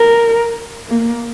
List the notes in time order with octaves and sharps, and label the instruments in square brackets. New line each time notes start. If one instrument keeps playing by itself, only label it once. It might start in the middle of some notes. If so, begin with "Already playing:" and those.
Already playing: [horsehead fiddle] A#4
A#3